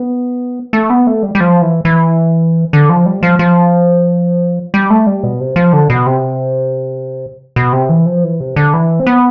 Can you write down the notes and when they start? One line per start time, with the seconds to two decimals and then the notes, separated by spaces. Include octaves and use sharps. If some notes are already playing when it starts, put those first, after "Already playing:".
Already playing: B3
0.73 A3
0.90 B3
1.07 A3
1.23 G3
1.35 G3
1.40 F3
1.62 E3
1.85 E3
2.73 D3
2.89 F3
3.06 G3
3.23 F3
3.39 F3
4.74 G3
4.90 A3
5.07 G3
5.23 B2
5.40 C3
5.56 F3
5.73 D3
5.90 B2
6.06 C3
7.56 B2
7.72 C3
7.89 E3
8.06 F3
8.24 E3
8.40 C3
8.56 D3
8.74 E3
9.00 C4
9.07 B3